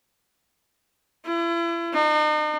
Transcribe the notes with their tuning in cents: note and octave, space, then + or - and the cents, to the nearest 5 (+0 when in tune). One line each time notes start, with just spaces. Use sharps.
E4 +40
D#4 -40